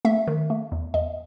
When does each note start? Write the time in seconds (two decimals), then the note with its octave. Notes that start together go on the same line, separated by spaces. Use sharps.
0.05 A3 E5
0.27 D#3
0.50 A3
0.72 E2
0.94 E2 D#5